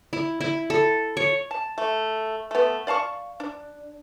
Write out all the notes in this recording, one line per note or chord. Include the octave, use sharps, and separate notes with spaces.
E4
E4
A4
C#5
A5
A3
A3 B3
D5 F5 A5 C#6
D4